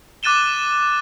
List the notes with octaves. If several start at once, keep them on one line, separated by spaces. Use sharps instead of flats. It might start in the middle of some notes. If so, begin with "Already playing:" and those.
D6 F#6 A6 D#7 E7 G7